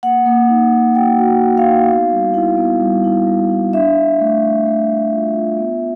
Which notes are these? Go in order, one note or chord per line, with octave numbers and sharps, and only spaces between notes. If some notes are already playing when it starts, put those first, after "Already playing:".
A#3 F#5
A#3
D#4
D#4
F#4 G5
F#4
F#4
F5
D#4
B3
G3
E4
B3
G3
E4
G3
E4
D4 E5
D4
A3
A3
A3
A3
F4
F4
B3